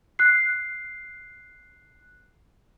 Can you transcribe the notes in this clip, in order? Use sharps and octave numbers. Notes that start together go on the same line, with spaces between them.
F#6 C7